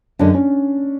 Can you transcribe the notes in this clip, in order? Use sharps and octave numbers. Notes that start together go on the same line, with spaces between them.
F#2 D3 G#3 C#4 D4
C#4